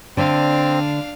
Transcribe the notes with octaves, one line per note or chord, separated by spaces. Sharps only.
D3 A3 C4 D4 F5